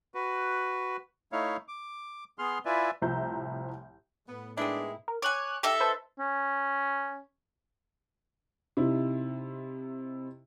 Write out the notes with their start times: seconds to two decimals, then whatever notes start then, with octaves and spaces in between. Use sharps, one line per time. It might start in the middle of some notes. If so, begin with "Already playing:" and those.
0.14 F#4 B4
1.32 A3 D#4 E4 C#5 F5
1.68 D6
2.39 B3 G#4 C6 F6
2.65 E4 F4 B4 D5 E5 G#5
3.02 C2 A2 F3 E5 A#5 G6
4.28 A2 B3
4.57 D#3 G#3 B3 D4 E4 G#4
5.08 A#4
5.22 C#5 G#5 D6 F#6
5.63 D#4 G4 A4 E5
5.80 B4 C5 A5
6.19 C#4
8.77 C3 D#4 E4